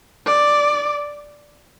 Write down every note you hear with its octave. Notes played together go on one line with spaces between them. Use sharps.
D5